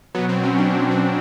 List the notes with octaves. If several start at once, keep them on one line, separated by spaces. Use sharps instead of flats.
B2 F#3 B3
C4
C#4
D4
C#4
C4